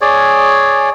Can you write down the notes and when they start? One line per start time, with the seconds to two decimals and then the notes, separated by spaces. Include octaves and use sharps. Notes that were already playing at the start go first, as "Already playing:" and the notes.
0.01 G#4 C#5 D5